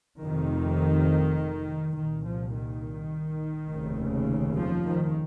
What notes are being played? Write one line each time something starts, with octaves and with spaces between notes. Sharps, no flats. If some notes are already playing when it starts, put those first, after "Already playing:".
F1 F2 C3 D#3
C2 A#2 D#3
F3
D#3
F1 D#2 C#3
F3
D#3